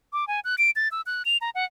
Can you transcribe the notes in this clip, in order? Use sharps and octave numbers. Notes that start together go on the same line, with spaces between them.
D6
G#5
F#6
D7
A6
E6
F#6
F7
A#5
F#5